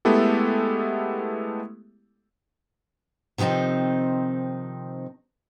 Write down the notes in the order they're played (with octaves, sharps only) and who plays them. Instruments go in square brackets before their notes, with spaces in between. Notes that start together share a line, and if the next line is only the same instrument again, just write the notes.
[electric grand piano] G#3 A3 B3 E4 G4 A4
[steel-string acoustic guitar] C3 D#3 F3 C4 D#4